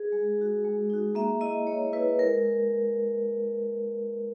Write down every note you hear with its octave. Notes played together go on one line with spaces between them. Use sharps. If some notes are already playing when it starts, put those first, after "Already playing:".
Already playing: G#4
G#3
D#4 F#4
G#3
D#4 F#4
A#3 E5
E4 D#5
A#3 C#5
E4 B4
G#3 A#4